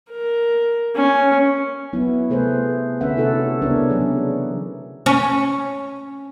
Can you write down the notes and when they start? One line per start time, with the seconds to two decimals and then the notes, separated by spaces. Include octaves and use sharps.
0.10 A#4
0.96 C#4
1.93 F#3 B3 E4
2.30 C3 A3 G#4 B4 C5
3.01 D3 C#4 B4 E5 F#5
3.17 C3 E4 F#4 A4 F#5
3.62 C#3 G3 B3 D4 A#4 C#5
3.90 E3 F#3 G#4
5.06 C#4